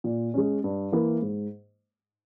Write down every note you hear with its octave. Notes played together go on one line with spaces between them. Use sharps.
A#2
G#3 C#4
G2
E3 A#3 E4 A#4
G#2